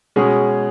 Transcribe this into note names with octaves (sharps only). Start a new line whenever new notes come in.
B2 G#3 C#4 G#4